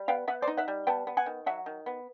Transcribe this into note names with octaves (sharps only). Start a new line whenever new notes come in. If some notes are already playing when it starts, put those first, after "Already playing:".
Already playing: G3
B3 F5 G5
B3 E5 F#5
C5 D5
D#4
E5 F#5
G3
B3 G5 A5
B3
F#5 G#5
D#3
F#3 E5 F#5
D#3
B3